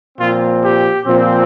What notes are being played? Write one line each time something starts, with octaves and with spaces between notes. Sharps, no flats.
A#2 F3 C4 F4
G4
A#2 F3 C4